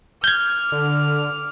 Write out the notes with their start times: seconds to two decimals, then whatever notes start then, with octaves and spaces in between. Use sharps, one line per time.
0.24 D6 F6 G6 G#6
0.72 D3